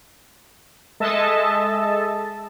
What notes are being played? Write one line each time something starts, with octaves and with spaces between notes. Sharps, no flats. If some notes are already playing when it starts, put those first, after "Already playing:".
G#3 A4 D#5 E5 A5